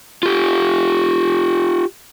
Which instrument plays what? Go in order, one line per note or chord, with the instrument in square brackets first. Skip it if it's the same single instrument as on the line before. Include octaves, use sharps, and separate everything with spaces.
[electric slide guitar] F4 G4